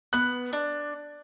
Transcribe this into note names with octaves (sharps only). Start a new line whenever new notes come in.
B3 F#6
D4